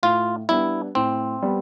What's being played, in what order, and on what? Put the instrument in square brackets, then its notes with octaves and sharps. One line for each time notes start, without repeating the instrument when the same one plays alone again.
[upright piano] A2 [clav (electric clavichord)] F4
[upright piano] G3 B3 D4 [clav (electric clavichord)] E4
[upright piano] A2 [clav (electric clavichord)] C4
[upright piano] G3 B3